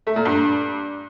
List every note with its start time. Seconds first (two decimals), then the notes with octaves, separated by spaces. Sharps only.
0.07 A3
0.16 A#2
0.25 G2